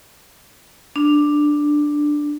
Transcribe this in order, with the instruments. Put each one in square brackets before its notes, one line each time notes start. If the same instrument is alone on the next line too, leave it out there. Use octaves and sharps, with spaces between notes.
[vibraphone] D4